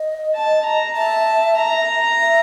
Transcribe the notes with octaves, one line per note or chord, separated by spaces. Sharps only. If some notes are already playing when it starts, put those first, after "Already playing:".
Already playing: D#5
A5
A#5
E5 A5
A#5
E5